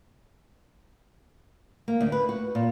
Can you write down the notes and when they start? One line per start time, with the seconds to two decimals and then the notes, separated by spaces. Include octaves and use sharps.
1.88 A#3
2.01 D2
2.12 B4
2.29 F#4
2.55 A#2